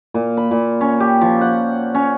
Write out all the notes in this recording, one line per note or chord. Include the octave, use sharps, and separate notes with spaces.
A#2
B5
A#2
C#4
G4
F3
F#5
C#4